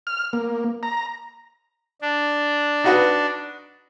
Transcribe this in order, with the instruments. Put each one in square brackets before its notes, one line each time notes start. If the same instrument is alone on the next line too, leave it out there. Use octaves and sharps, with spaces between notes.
[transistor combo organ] F6
A#3
A#5
[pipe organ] D4
[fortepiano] D#4 F#4 B4